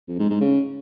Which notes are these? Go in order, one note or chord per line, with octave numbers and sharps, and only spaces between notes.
F2
G#2
G#2
C#3